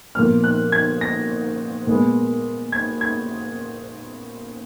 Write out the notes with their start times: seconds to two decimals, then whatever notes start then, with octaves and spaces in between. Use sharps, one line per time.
0.15 A#2 F3 B3 F6
0.44 F#6
0.72 G#6
1.01 A#6
1.87 A#2 G#3 B3
2.72 G#6
3.01 G#6